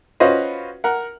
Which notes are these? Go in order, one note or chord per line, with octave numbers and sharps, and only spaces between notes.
C#4 F4 F#4 B4 C5 D#5
A#4 F#5